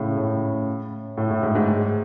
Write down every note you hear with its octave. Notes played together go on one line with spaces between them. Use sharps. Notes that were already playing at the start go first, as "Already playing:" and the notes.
Already playing: A2 C#3
A2
A2
A2
G#2
G#2
G#2